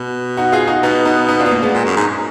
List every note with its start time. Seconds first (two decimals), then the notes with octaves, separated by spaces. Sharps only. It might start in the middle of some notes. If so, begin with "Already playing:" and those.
Already playing: B2
0.37 D#4 F#4
0.52 F4 G#4
0.67 D#4 F#4
0.82 B2 B3 D#4
1.05 B3 D#4
1.28 B3 D#4
1.40 D4 F4
1.46 B3
1.51 A#3
1.62 G#3 B3
1.74 A#2 G#3
1.85 F#2
1.96 G#2